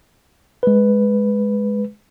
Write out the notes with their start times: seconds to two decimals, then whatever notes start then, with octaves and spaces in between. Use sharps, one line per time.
0.63 G#3 B4